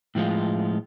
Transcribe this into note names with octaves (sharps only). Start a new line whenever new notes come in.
A2 F3 G#3 F4